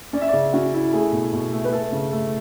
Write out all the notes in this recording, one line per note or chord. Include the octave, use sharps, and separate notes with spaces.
C#4 D5
E5
C#3 D5
C#4 F#4
E4
A3 G#4
B2
B2
A3
B4
A3 A4
C#3
A3